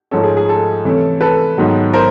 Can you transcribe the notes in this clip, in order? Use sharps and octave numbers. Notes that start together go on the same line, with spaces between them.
G#2 F3 A3 C#4 A4
G#4
G#4
A4
C3 E3 A3 C#4
A4 B4
G#2 D#3 F#3 B3
A#4 C5